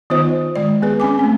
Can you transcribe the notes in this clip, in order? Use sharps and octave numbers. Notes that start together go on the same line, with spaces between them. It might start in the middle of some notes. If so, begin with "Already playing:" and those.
D#3 B3 D#4 F4 C5 D#5
D#3 G#3 D5
B3 G#4 B4
C4 C#4 G#5 D6
A3 C4